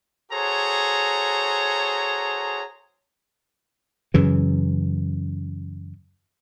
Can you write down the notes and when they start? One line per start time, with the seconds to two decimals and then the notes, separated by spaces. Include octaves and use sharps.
0.32 F#4 G#4 A4 C5 C#5 A#5
4.14 F#2 C#3 E3